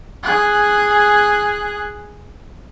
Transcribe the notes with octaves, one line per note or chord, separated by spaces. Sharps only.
G#4 F#6